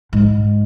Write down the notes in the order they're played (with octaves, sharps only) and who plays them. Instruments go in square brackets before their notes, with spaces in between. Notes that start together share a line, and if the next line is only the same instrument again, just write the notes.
[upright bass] G#2